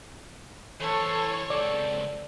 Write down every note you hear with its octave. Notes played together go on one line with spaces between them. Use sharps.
E3 A4 C5 C#5
C#2 C4 A4 D5